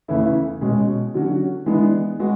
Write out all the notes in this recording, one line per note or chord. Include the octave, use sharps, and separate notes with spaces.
E2 C#3 E3 A3 E4
B2 G#3 C#4
D3 F#3 C#4 F#4
E3 G#3 B3 D4
G#3 B3 F#4